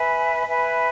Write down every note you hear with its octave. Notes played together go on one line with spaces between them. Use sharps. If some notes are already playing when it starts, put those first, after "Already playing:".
Already playing: B4 E5 G#5 B5
B4 E5 G#5 B5